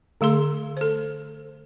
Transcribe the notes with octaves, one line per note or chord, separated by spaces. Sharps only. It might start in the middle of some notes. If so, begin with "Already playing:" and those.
D3 A3 G#4 C6
A4 C5